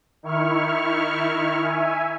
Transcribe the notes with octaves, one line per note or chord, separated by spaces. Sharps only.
D#3 E4 C#6 F6
E5 G#5